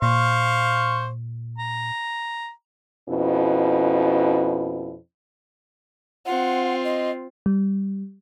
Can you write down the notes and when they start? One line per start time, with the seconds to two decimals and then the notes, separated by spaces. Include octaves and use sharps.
0.02 A#2 C5 F5 C#6
1.58 A#5
3.08 F2 B2 C#4 E4
6.26 C4 F4 F#5
6.84 D#5
7.46 G3